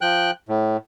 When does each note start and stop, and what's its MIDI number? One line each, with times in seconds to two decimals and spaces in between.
0.01 0.31 53
0.01 0.31 79
0.01 0.31 90
0.49 0.77 45